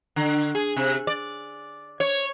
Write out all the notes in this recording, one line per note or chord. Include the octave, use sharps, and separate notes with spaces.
D3
G#4
C3
D5
C#5